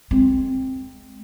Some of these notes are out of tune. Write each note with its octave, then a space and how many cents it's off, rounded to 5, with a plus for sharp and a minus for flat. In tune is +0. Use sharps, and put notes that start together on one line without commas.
G#3 +0 C4 +0